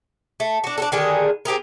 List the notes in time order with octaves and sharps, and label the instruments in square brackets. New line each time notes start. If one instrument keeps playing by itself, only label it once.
[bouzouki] A3
D4 F#4
D4 F#4 A4
D3 D#3 G3 G#4
C4 G4 G#4 A#4